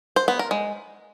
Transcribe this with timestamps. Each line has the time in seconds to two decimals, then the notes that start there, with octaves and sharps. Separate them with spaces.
0.16 C5
0.28 B3
0.39 A#4
0.51 G#3